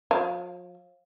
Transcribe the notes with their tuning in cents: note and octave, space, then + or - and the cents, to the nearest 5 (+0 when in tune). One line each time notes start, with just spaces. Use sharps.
F3 +45 F5 +0